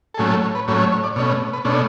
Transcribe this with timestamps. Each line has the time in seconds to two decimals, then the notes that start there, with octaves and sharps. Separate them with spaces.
0.14 A4
0.18 A2 F#3 A3 C#4 G#4
0.30 A4
0.42 C#5
0.55 B4
0.68 A2 F#3 A3 C#4 C#5
0.80 C#5
0.92 C#5
1.04 D5
1.16 B2 A3 C#4 C#5
1.53 B4
1.65 B2 A3 C#4 D4